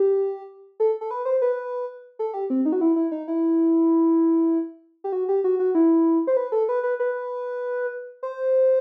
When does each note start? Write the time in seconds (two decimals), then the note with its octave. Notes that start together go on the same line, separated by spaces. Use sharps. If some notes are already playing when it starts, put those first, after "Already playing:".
Already playing: G4
0.80 A4
1.01 A4
1.11 B4
1.25 C5
1.42 B4
2.19 A4
2.34 G4
2.50 C4
2.65 D#4
2.72 F#4
2.81 E4
2.96 E4
3.12 D#4
3.28 E4
5.04 G4
5.13 F#4
5.29 G4
5.44 F#4
5.59 F#4
5.75 E4
6.27 C5
6.37 B4
6.52 A4
6.69 B4
6.83 B4
7.00 B4
8.23 C5